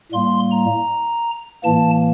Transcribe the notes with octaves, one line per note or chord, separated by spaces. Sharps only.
A2 G3 A#3 C6
A#5
A2 E3 A#3 A5